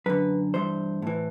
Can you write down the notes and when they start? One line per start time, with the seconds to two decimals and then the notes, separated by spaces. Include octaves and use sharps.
0.06 F#2 D3 B4
0.54 G2 E3 C5
1.02 A2 E3